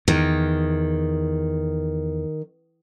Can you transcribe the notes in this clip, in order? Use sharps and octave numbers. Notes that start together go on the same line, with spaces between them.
E2 D#3